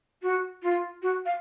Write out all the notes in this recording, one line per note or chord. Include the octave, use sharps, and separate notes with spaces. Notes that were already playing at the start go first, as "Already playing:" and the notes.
F#4
F4
F#4
F5